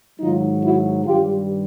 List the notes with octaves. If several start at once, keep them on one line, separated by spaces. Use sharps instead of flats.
G#2 D#3 F#3 D#4 F4
E4 F#4
G2 D#3 G3 F4 G4